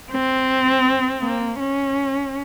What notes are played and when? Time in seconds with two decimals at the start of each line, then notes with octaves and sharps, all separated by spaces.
0.12 C4
1.23 A#3
1.59 C#4